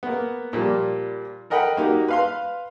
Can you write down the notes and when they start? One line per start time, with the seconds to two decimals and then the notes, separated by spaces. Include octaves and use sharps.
0.03 A#3 B3
0.53 A#2 F3 G3 A#3
1.50 A4 A#4 D#5 F#5 G5 B5
1.77 A#3 D#4 F#4 G4
2.08 B4 F5 C6